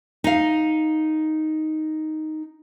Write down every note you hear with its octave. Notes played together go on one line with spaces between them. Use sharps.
D#4 F5